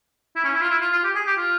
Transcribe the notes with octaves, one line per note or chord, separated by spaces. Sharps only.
E4
C#4
E4
F4
E4
F4
F4
G4
G#4
G4
F4